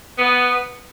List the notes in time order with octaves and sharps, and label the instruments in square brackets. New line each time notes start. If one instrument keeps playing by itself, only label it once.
[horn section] B3